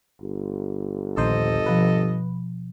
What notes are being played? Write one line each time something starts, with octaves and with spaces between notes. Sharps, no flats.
G1
A#1 D#2 A4 C5 D#5
B2 F3 B4